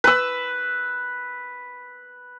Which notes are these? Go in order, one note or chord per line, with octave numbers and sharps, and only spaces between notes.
B4 E6